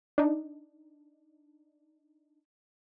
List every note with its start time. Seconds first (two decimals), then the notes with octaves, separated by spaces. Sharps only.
0.18 D4 D#4